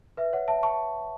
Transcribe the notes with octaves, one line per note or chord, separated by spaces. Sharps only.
B4 E5
C#5 F#5
E5 A5
A5 C#6